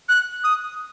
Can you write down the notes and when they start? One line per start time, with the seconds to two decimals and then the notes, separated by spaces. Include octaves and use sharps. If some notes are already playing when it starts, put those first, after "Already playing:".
0.09 F#6
0.44 D#6